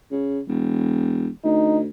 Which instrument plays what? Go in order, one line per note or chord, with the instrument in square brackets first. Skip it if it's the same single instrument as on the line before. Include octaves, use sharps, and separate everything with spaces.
[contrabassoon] C#3
E1
[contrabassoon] D2 [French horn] D#4